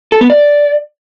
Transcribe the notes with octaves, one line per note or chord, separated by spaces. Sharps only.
A4
B3
D5